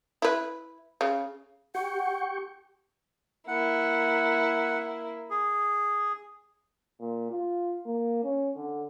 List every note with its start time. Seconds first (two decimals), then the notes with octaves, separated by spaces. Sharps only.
0.22 E4 B4
1.01 C#3
1.75 G4 F#5 G5 C#6
3.48 A#3 E4 F#5
5.30 G#4
7.01 A#2
7.31 F4
7.86 A#3
8.24 C#4
8.56 D3